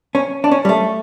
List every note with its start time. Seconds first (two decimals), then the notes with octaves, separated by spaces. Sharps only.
0.15 C#4
0.44 D4
0.51 C#4
0.65 G3
0.69 A3